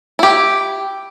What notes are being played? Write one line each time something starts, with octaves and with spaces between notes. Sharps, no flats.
E4 G4